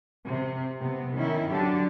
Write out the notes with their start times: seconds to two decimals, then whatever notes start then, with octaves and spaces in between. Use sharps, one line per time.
0.25 C3
0.80 C3 B3
1.13 D#3 C#4 E4
1.49 D3 F#3 D4 G4